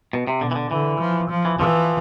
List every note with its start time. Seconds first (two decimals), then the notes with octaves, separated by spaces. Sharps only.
0.13 B2
0.27 C3
0.41 B2 D3
0.51 E3
0.55 D3
0.71 D3 E3
1.00 F3
1.30 F3
1.45 E3
1.59 E3 F3